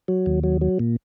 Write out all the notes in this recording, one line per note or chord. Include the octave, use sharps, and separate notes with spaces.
F#3
D#2
F#3
F#3
A#2